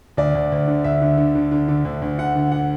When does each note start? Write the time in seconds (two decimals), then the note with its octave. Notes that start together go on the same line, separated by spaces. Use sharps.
0.17 D2 D5
0.35 D2
0.52 D2
0.68 D3
0.84 D2 E5
1.01 D3
1.17 D3
1.35 D3
1.51 D3
1.68 D3
1.85 D2
2.02 D2
2.18 D3 F#5
2.35 D3
2.52 F#5